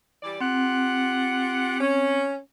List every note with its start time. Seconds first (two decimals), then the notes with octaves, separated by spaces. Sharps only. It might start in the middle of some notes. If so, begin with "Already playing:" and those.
0.23 E3 G3 D5
0.41 C4 F4 G4 F#5
1.80 C#4